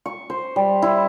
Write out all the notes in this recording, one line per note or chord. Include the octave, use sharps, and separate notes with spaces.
C#6
C5
G3
E4